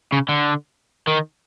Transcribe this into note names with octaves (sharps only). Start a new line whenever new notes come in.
C#3
D3
D#3